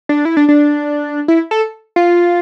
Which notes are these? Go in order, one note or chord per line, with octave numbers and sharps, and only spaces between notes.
D4
E4
D4
D4
E4
A4
F4